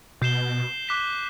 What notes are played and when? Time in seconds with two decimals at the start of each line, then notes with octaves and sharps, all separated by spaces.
0.22 B2 G6 C7 E7 G7
0.87 D6 F#6 B6 E7 G7